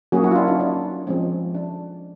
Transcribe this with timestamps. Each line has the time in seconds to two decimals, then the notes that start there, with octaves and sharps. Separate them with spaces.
0.12 F#3 A#3 C#4 F#4 G#4
0.23 E4 F#4
0.31 F4
0.35 D4 E4
0.48 C#4 D#4
0.60 D4
1.07 F3 G#3 C4 C#4
1.54 D4